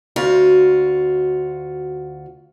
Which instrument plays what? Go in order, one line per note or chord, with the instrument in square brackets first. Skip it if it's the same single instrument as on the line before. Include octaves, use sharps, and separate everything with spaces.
[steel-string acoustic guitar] D2 F4 F#4